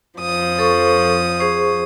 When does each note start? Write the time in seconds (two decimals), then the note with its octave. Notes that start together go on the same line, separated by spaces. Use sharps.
0.18 F2 F3 D#6
0.59 A4 C5 C#6
1.39 G#4 C5 C#6